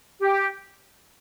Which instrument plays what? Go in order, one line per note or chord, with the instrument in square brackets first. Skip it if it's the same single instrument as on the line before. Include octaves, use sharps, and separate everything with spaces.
[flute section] G4